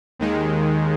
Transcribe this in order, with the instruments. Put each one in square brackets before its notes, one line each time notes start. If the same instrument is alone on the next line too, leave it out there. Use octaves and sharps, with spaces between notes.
[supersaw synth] D#2 D#3 G#3